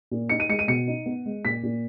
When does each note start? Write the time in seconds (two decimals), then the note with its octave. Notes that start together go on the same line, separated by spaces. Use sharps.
0.11 A#2
0.29 D#4 C#7
0.40 D#7
0.49 G#3 C#7
0.59 D#7
0.68 B2 C#7
0.88 D#4
1.06 B3
1.26 G#3
1.45 A#2 B6
1.63 A#2